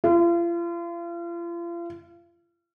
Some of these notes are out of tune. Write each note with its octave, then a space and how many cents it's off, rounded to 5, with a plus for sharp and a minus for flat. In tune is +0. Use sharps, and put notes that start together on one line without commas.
F4 -40